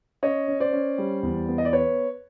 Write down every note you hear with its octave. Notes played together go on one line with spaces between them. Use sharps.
C#4 C#5 D#5
C#4
C5 D5
C#4
G3
E2
B3
D#5
D5
B4 C#5